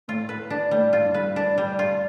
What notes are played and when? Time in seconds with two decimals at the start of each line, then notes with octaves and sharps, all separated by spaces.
0.08 A2 F4
0.29 B4
0.50 D4
0.71 A2 G3
0.93 F4
1.04 G2
1.14 B4
1.36 D4
1.58 G3
1.79 F4